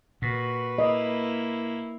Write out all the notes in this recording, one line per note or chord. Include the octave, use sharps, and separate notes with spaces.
A#2 F#4 B4
A#3 E4 D#5